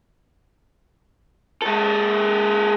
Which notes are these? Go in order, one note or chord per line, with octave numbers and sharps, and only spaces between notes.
G#3 A4